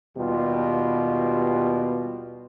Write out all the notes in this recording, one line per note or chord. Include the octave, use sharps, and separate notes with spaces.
D#2 B2 G3 F4 G4